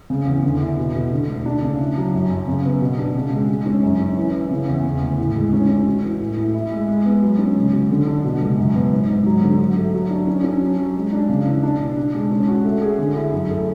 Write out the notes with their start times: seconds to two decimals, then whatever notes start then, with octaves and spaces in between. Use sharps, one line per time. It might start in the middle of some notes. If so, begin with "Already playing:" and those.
0.10 C#3
0.26 E2
0.44 D3
0.61 E4
0.78 B2
0.95 B2
1.11 D3
1.28 D2
1.46 D4
1.62 C#3
1.79 E4
1.97 F#3
2.13 F#2
2.30 F#2
2.47 C#3
2.64 B3
2.81 B2
2.98 D4
3.15 C#3
3.32 G#3
3.49 G#3
3.66 C#4
3.83 F#2
3.99 C#4
4.17 E3
4.34 E3
4.51 C#3
4.68 E2
4.85 C#3
5.01 D2
5.19 A2
5.35 G#3
5.53 C#4
5.69 C#4
5.87 F#4
6.03 E3
6.20 A2
6.37 A2
6.54 E4
6.72 G#3
6.88 G#3
7.05 B3
7.22 F#3
7.39 C#4
7.56 C#2
7.72 F#3
7.90 D3
8.07 D4
8.24 B2
8.41 C#2
8.57 F#2
8.74 B3
8.92 G#2
9.09 G#2
9.26 F#3
9.42 D3
9.59 F#3
9.77 A3
9.94 F#3
10.10 D4
10.27 C#4
10.44 C#4
10.61 F#3
10.79 F#3
10.96 G#3
11.13 D4
11.29 C#3
11.46 E3
11.63 D4
11.79 B2
11.97 D4
12.14 G#3
12.31 C#4
12.48 F#4
12.65 A3
12.82 G#4
12.98 D3
13.16 E4
13.32 F#2
13.49 A3